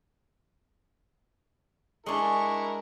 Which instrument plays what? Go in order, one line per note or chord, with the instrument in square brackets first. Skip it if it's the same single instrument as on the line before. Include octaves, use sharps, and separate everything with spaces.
[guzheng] G#3 D4 [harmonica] E4 A#4 [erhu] C#6